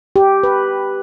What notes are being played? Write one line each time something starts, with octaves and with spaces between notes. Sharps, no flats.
G4
B4